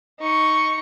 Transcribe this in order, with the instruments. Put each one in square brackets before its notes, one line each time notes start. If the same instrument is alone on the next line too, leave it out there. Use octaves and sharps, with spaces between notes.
[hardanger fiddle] D#4 C#6